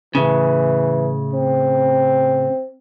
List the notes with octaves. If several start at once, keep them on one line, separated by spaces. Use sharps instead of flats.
A2 C#3 E3
C4